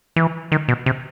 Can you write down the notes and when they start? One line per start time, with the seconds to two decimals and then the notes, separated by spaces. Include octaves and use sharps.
0.16 E3
0.52 D#3
0.68 B2
0.86 C3